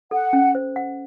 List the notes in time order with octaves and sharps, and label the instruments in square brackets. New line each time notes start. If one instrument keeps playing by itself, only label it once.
[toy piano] A4 [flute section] F#5
[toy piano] C#4
C5
F#5